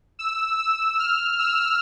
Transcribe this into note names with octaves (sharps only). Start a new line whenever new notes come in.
E6
E6
F6
E6